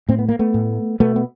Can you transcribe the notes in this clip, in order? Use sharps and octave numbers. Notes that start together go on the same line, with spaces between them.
A2 C4
B3
A#3
A3 B3
A2
B2 A3 B3
B3